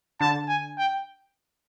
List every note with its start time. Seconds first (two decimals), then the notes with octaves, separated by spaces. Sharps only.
0.21 D3 A5
0.48 G#5
0.78 G5